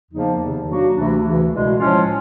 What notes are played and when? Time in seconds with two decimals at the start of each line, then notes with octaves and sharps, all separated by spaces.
0.10 E2 C#3 F3 A#3 D#4
0.38 E2 C3 D#3
0.66 F#3 A#3 D4 F#4
0.95 D2 C3 E3 A3 D4
1.22 D2 C#3 E3
1.50 C2 B2 G#3
1.78 A2 F3 G#3 C#4 F4